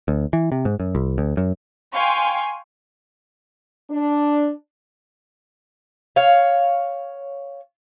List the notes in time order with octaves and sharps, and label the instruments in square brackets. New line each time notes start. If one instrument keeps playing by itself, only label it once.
[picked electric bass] D2
E3
C3
G#2
F#2
C2
D2
F#2
[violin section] F5 G5 G#5 C6 C#6
[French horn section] D4
[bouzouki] C#5 F5